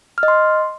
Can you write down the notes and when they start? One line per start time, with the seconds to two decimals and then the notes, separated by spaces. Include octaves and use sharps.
0.18 F6
0.23 D#5
0.28 C6